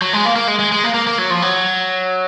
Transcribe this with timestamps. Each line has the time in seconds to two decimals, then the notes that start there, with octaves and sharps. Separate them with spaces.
0.02 F#3
0.13 G#3
0.25 A#3
0.36 A#3
0.47 G#3
0.59 G#3
0.72 G#3
0.84 A#3
0.94 A#3
1.07 A#3
1.18 F#3
1.30 F3
1.42 F#3